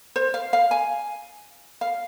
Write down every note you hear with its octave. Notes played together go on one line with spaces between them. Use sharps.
C5
F5
F5
G#5
F5